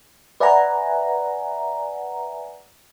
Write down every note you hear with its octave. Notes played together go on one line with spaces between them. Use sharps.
B4 D5 E5 F#5 G#5 A#5